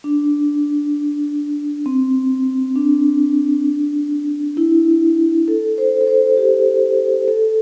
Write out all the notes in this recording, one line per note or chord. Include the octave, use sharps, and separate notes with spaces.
D4
C4
D4
E4
A4
C5
A4
C5
G4
A4